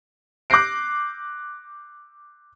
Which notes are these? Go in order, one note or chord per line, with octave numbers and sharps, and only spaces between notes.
D6 F#6 G6 A#6 C7 D7